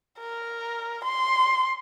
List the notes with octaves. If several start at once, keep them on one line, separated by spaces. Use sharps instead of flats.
A#4
C6